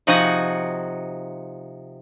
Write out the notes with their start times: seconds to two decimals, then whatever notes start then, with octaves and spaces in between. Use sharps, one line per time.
0.07 C3 F3 D#4 F#4 F#5 G#5